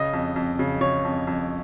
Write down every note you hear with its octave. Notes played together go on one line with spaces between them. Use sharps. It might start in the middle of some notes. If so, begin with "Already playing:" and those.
Already playing: C#3 D#5
F2
F2
C#3
C#3 C#5
F2
F2